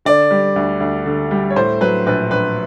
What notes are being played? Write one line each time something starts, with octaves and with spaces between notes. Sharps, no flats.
D3 D5
G3
D2
D2
D3
G3
C#5
A2 C5
F#3 B4
A#1 B4
A#1 B4